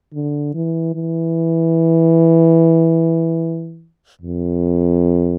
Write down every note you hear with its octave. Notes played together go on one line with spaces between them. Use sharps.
D3
E3
E3
F2